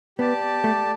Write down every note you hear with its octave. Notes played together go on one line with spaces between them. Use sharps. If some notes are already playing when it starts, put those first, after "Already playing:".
B3 G4 D5 A5
A3